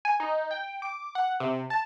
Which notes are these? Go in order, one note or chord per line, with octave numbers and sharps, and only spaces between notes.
G#5
D#4
G5
D6
F#5
C3
A5